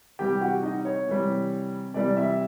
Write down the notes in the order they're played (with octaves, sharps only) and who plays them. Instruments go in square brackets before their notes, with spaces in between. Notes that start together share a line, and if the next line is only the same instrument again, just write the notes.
[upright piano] C3 E3 G3 [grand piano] G4 G5
[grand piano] F#4 F#5
D#4 D#5
C#5
[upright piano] C3 E3 G3
[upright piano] C3 E3 G3 [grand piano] D5
[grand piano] E4 E5